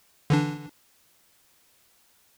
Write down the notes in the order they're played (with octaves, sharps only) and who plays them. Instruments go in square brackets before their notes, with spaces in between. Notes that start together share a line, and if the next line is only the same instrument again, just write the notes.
[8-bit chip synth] D3 E3 D4